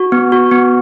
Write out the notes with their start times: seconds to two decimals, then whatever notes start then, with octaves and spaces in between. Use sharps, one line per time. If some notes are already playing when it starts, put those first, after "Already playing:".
Already playing: F#4
0.12 B3
0.32 F#4
0.51 B3